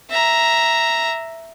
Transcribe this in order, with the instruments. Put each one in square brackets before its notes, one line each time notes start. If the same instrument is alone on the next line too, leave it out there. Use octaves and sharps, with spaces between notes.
[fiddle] E5 A#5